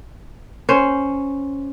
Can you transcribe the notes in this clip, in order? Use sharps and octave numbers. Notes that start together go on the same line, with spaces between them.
C#4 C5